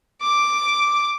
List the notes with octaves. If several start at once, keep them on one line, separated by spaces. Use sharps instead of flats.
D6